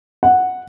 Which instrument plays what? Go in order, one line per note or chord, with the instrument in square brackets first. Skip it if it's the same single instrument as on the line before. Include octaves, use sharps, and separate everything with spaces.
[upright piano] F#5